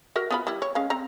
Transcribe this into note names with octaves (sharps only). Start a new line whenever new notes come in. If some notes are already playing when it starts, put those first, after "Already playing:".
F#4 A#4 E5
B3 F4 B5
G3 E4
C#5
G#3 C#4 F5
C4 A#5